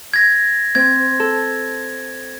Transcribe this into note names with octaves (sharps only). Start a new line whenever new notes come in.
G#6 A#6
C4 G#6
A4